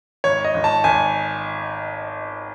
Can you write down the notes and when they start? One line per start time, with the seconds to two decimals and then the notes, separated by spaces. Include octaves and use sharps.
0.24 G#1 C#5
0.45 D#5
0.54 G#1
0.64 A5
0.84 G#1 G#5